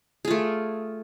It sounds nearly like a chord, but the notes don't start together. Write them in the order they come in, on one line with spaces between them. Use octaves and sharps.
G#4 F4 A3